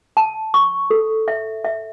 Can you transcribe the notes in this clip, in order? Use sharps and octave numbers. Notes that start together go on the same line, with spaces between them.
A5
C#6
A4
E5
E5